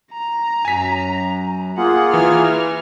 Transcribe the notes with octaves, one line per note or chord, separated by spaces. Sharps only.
A#5
F#2 G#5 B6
A#3 F4 G#4 F#5
E3 F6